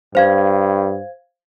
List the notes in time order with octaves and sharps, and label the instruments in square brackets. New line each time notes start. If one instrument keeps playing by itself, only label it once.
[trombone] G2 [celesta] C5 F5 G#6